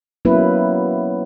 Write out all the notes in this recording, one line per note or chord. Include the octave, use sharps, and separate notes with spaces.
F#3 A#3 B3 C#4 E4 B4